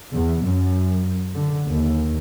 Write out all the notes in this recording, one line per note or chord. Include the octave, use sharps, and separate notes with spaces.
E2
F#2
D3
D#2